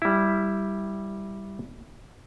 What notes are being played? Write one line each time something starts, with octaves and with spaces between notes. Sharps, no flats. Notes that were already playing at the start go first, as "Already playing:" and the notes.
G3 E4